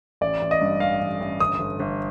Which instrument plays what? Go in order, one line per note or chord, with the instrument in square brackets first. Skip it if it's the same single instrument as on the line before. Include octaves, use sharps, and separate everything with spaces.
[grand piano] A1 D5
A1
D#5
G2
A1 F5
A1
A1
G1 D#6
G1
G1